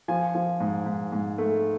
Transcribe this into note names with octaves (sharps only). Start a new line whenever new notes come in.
F3 G#5
F3
G#2
G#2
G#2
A3